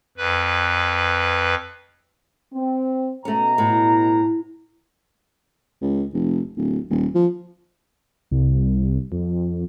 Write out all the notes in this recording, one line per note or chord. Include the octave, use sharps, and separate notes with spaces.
F2 B4
C4
B2 A3 C#4 A#5
A2
C#2
F1
D1
D#1
F3
C2
F2